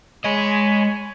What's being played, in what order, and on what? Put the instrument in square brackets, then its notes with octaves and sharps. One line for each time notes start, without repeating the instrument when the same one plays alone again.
[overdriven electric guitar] G#3 D#5 [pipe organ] C#5 G#5 B5